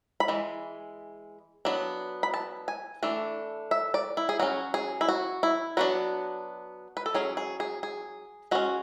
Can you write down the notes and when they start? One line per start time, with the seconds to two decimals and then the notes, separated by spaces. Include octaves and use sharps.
0.20 B5
0.28 E3 G#3
1.65 F#3 B3 D4
2.23 B5
2.34 A5
2.68 G#5
3.03 E3 A3 D4
3.71 E5
3.94 D5
4.17 E4
4.29 G#4
4.39 F#3 C#4 F#4
4.74 G#4
5.01 E4
5.08 F#4
5.43 E4
5.77 F#3 B3 D4 F#4
6.97 B4
7.06 A4
7.14 F#3 C#4 G#4
7.37 G#4
7.60 G#4
7.83 G#4
8.51 G#3 C#4 F#4